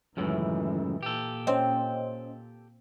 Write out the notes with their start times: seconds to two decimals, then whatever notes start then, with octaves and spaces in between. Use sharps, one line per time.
0.17 C#2 F#2 A2 D#3 E3
1.03 A#2 G4 A4
1.47 C4 C#4 C5 D#5